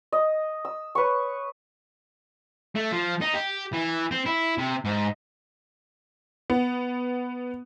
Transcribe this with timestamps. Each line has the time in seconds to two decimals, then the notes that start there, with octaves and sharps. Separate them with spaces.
0.12 D#5
0.65 E6
0.95 B4 C#5 C#6
2.76 A3
2.92 F3
3.21 D#4
3.34 G4
3.73 E3
4.11 C4
4.26 E4
4.58 C3
4.85 G#2
6.50 B3